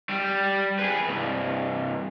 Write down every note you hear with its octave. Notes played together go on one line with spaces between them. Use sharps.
G3
G#4 B4
C2 G2